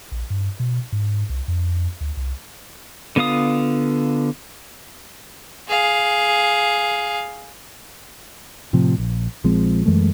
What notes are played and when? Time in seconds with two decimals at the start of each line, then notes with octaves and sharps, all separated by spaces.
0.12 A#1
0.30 G2
0.60 B2
0.92 G#2
1.29 C2
1.48 F2
2.01 D2
2.17 C2
3.16 D3 B3 F4 F5 D#6
5.68 G#4 F5
8.73 A2 C3 F3
8.98 A#1
9.44 A#1 F3 G#3 C4
9.85 F#2 E3 G#3 A3